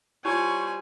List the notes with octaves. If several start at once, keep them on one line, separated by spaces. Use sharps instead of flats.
G3 E4 F4 C5 C#5 G#5 C#6